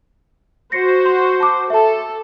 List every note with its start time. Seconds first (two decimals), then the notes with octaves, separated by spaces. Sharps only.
0.72 F#4 C5 A#6 C7 C#7
1.05 C6
1.40 A5 D6
1.70 A4 E5 A5